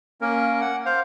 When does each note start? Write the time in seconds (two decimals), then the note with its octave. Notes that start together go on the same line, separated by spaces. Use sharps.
0.21 A#3 C#4 A#4
0.61 F#5
0.86 C5 F5